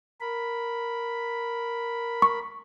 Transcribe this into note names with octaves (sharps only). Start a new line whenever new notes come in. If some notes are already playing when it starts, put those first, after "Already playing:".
A#4 B5
C#6